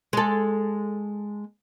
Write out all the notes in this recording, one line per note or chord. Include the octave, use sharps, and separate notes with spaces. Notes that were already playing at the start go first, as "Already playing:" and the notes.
G#3 A4